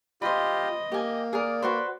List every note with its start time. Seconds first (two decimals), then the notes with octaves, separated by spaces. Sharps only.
0.22 F4 G4 C5 D#5 B5
0.92 A#3 G4 G#5
1.33 G#4 A#4 D5
1.62 F#4 B4 C5